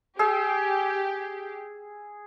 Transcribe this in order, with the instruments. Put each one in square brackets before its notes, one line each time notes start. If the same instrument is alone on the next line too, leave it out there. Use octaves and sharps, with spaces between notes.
[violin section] G4 [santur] G#4 E6